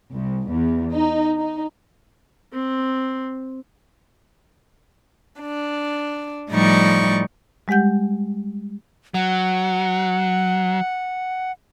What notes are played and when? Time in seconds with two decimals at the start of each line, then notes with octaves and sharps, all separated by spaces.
0.13 C2
0.49 E2
0.93 D#4
1.38 D#4
2.52 C4
5.39 D4
6.50 A2 F3 G3 D#4 D5 C#6
7.68 G3 G#3 G4 F#5 G6
9.14 F#3 F#5